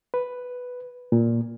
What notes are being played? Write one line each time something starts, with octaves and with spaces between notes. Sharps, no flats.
B4
A#2